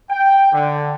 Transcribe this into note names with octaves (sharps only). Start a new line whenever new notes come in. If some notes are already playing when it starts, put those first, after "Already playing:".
G5
D3